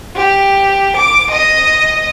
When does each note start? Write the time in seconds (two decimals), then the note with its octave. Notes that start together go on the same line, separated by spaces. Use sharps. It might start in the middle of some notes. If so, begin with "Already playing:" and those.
0.14 G4
0.96 D6
1.30 D#5